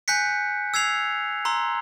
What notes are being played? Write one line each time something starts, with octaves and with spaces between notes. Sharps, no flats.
G#5 F#6 G6 B6 C#7
E6 G#6 C7 F7
A#5 C6 E6